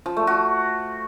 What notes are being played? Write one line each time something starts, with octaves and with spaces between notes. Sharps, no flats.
F3
A3
F#4